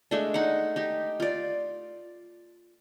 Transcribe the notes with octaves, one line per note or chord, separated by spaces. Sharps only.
G#3 A3 D4
D#4 F#5
D#4 G4
F4 D5